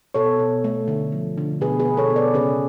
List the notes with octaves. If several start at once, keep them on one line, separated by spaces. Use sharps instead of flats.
B2 A4 C#5
B2
A3
D3
F3
D3
B2 G#4 B4
G#4 B4
B3
A4 C#5
B2
B4 D5
C#3 G#4 B4